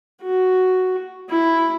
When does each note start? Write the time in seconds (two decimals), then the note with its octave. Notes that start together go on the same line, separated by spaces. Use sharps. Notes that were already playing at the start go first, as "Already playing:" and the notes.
0.22 F#4
1.29 E4